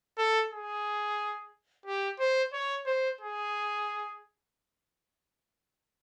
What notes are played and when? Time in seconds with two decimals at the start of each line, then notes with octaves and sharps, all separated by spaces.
0.18 A4
0.51 G#4
1.86 G4
2.19 C5
2.53 C#5
2.86 C5
3.21 G#4